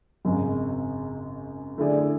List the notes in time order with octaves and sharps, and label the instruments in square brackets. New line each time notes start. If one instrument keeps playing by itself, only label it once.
[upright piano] G#1 F#2 C#3 G#3
D3 A3 E4 G#4 D5